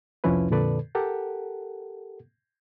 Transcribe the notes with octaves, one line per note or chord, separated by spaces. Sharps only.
C2 F2 F3 C#4 E4 B4
F2 A#2 D3 A4 B4 D5
G4 A4 A#4 F#5